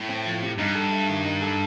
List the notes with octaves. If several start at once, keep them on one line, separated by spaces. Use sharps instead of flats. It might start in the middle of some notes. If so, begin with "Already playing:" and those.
Already playing: A2
C4
F3
C3
G2 D#4
A4
A3
D#3
D#4
A4